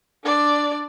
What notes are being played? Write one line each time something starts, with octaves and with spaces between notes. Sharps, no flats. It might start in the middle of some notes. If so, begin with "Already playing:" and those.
D4 D5